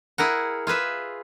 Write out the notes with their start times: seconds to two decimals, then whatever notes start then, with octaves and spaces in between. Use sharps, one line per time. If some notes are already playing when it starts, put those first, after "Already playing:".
0.18 E4 G#4 A#4 F#5
0.67 F4 G#4 B4 E5